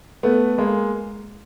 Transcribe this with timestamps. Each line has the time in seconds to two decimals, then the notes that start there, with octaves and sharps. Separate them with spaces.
0.23 A3 B3
0.58 G#3 A#3